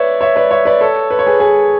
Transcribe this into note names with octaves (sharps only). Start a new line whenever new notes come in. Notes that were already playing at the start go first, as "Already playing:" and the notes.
Already playing: B4 C#5 D5 E5
C#5 E5
B4 D5
C#5 E5
B4 D5
A4 C#5
B4
C#5
G#4 B4
G#4 B4